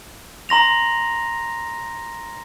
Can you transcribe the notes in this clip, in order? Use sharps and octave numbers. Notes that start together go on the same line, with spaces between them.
A#5 C6 A#6 F7